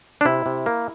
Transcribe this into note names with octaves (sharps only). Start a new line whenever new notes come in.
D4
C3 E4
C3
A#3